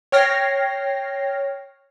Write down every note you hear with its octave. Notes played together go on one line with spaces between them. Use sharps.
C#5 G5 F6 A#6 C7